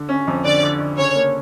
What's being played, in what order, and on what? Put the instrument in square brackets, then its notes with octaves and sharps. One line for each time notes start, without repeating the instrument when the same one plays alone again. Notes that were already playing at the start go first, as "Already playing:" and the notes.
Already playing: [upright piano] D3
C#4
F2
[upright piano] D3 [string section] D5
[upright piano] D3
D3
[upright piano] C#3 [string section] C#5
[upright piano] A#3